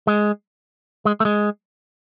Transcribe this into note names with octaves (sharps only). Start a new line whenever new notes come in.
G#3
G#3
A3
G#3